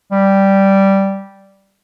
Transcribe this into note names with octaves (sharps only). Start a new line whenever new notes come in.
G3